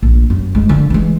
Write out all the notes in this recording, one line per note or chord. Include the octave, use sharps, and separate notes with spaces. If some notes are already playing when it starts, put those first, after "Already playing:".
A#1
F#2
G#3
D3 F3
E3 G#3